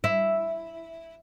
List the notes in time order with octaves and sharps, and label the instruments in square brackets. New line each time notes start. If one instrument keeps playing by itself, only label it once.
[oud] E4